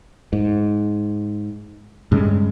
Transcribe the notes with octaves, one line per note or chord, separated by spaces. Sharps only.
G#2
G2 C#3 G#3